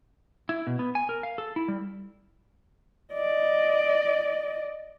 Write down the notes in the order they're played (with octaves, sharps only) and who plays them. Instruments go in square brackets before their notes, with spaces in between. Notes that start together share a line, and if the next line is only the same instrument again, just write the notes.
[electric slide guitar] E4
B2
B3
G#5
A#4
F5
A4
E4
G3
[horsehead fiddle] D5 D#5